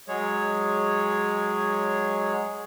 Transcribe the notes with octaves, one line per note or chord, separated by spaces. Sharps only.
F#3 G#3 G#4 C#5